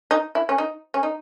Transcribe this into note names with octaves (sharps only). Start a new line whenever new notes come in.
D#4
E4
C#4
D#4
C#4
D#4